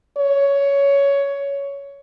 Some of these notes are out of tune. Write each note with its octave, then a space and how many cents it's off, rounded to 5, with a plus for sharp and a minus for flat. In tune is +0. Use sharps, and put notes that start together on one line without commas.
C#5 +15